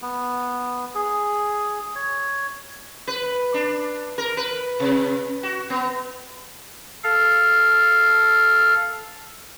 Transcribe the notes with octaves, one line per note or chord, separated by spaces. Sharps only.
B3
G#4
C#5
B4
D4
A#4
B4
C3
F#4
B3
A4 F5